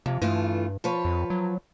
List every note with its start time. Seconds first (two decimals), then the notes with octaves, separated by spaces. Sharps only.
0.06 F2 C3
0.22 G2 E3 A3 F4
0.84 F3 B4 C#5
1.05 F2
1.30 F#3